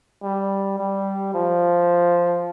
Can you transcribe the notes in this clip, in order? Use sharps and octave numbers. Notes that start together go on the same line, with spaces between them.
G3
G3
F3